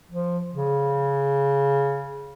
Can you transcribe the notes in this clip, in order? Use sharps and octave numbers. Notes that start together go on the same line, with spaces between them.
F3
C#3